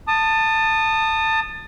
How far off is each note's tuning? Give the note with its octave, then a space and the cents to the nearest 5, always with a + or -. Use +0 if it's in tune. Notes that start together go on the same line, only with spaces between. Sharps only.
A5 +15 D#6 -20